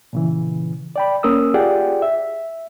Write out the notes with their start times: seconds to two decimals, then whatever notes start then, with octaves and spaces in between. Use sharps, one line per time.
0.13 A#2 C#3 E3
0.96 D5 G5 B5
1.23 A#3 C#4 A#4 D#6 E6
1.54 F4 G4 G#4 D5 F#5 G5
2.02 E5